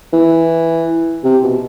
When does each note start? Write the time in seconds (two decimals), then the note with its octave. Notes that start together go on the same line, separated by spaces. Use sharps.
0.13 E3
1.24 C3
1.43 B2